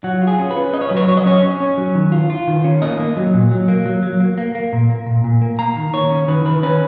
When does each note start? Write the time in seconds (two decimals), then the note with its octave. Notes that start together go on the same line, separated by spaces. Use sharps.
0.04 F#3 F#4
0.22 F4
0.27 G#4
0.39 C#4
0.51 B4
0.57 C#4
0.73 C#4 D#5
0.81 C#5
0.89 F#3 B4
0.97 C#5
1.08 F#3 C#5
1.17 D#5
1.26 C#4 C#5
1.43 C#4
1.60 C#4
1.78 F#3
1.95 D#3
2.12 F4
2.30 F4
2.47 D#3
2.64 C#4
2.82 A#3 D#5
2.99 A#3
3.17 F#3
3.34 A#2
3.51 F#3
3.68 A#3
3.86 F#3
4.03 F#3
4.20 A#3
4.38 A#3
4.55 A#3
4.73 A#2
4.90 A#3
5.07 A#2
5.24 A#2
5.41 A#3
5.59 A#3 A#5
5.77 D#3
5.93 D#3 C#5
6.11 C#4
6.28 D#3 B4
6.45 D#3 B4
6.63 C#4 B4